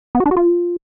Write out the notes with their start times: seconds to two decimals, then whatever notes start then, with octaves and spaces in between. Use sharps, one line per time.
0.15 B3
0.20 F#4
0.26 D4
0.31 F#4
0.37 F4